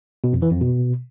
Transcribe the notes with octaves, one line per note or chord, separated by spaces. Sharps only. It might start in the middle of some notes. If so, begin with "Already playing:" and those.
B2
F2
E3
F2
B2